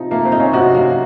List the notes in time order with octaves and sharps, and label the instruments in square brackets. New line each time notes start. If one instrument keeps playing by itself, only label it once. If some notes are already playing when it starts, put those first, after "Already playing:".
Already playing: [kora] C3 F3 [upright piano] D#4
[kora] A3 [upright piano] A#3
[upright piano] C4
[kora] D#4
[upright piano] C#4
[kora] C3 [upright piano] F#4
[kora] A#3